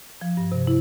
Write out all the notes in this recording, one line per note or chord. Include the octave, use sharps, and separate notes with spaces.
F3
G2
C3
E4